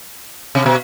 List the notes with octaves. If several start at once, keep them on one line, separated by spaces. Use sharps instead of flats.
C3
B2